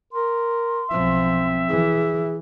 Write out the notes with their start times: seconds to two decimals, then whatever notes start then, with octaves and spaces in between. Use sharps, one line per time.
0.13 A#4 C6
0.91 B1 F3 C4 E5
1.69 E3 G#4